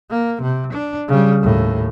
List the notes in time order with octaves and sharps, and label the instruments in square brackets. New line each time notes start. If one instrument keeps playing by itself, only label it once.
[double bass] A#3
C3
D4
C#3 G3
D#2 A2